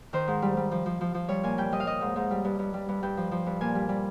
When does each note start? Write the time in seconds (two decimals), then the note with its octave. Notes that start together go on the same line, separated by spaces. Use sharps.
0.13 D#3 C5
0.28 G#2
0.42 G3
0.57 G3
0.71 F3
0.86 F3
1.01 F3
1.14 F3
1.28 G3 C#5
1.43 A#2 G#5
1.58 G3 G5
1.72 G3 D#5
1.80 F5
1.87 G3 D#5
2.01 G#2
2.16 G#2
2.31 G3
2.45 G2
2.59 G2
2.74 G3
2.89 G2
3.03 G2 G5
3.17 F3
3.31 F3
3.46 G2
3.61 A#2 G#5
3.75 G3
3.89 G3